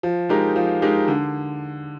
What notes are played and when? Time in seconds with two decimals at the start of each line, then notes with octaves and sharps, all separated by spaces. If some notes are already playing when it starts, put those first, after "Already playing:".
0.03 F3
0.29 G#3 D#4 G4 A#4
0.56 F3
0.82 G#3 D#4 G4 A#4
1.08 D3